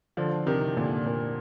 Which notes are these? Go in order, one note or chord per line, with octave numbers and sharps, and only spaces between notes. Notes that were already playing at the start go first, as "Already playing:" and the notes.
D3 F3
C3 D#3
A#2 D3
A#2